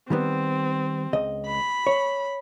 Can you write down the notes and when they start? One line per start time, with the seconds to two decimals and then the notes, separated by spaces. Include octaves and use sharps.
0.10 D#3 G3 B3 C4
1.13 C#2 D#5
1.46 B5
1.87 C#5